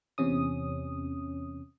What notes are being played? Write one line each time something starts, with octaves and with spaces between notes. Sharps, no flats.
E2 C3 C#4 D#6